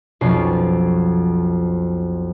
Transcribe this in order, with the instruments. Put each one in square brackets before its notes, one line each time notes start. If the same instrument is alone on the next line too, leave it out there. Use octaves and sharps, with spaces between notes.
[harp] B1 F2 B2 C#4 C7